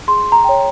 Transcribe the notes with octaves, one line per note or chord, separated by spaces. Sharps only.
G#4 C6
A#5
C#5 G5